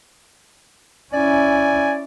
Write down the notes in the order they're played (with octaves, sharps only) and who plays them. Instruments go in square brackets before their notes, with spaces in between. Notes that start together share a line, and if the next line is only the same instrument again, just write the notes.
[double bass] C#4 E4 [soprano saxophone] D5 [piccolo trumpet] G#5